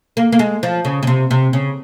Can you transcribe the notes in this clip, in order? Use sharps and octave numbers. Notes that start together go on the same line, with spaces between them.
A#3
A#3
G#3
F3
C#3
C#3
C3
C3
C#3